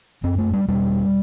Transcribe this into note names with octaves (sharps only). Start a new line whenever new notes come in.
F#2 C4
A3
G3
E2 B2 G3